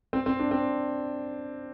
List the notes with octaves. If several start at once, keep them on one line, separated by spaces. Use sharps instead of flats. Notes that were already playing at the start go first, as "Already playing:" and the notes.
C4
C4
D4
C4